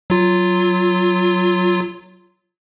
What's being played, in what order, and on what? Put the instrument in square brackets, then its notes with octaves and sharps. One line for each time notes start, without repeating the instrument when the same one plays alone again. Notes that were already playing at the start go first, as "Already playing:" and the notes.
[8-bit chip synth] F#3 F4